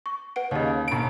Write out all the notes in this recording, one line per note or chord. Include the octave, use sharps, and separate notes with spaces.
C#6
B4 F#5 D7
D#2 C#3 C#5 D#5
E1 D7